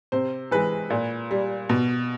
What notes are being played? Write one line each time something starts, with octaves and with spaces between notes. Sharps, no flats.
C3 C5
E3 G#3 B4
A#2
G3
B2